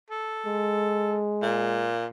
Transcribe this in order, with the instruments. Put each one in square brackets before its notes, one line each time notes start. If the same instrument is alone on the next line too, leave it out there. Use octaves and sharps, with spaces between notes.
[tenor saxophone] A4
[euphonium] G#3
[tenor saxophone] A#2